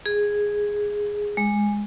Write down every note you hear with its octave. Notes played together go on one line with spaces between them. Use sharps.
G#4
G#3